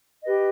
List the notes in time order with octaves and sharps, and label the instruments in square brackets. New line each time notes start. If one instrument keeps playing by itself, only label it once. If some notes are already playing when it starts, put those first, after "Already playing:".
[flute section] G4 B4 D#5